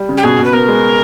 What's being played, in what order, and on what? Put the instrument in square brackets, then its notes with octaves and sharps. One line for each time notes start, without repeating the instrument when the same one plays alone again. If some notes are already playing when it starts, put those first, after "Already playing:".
Already playing: [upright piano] G3
C#3
[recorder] G4
[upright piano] B2 [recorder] G#4
[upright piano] B2 [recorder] B4
[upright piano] B3 [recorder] A#4
[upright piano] G#3